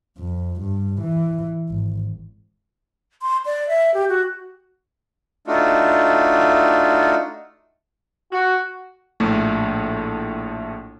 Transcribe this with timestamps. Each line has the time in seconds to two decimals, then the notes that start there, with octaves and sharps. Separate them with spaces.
0.18 F2
0.60 G2
1.02 E3
1.69 G#1
3.22 C6
3.46 D5
3.69 E5
3.94 G4
4.09 F#4
5.47 A3 D4 D#4 F4 F#4
8.32 F#4
9.20 A#1 A2 A3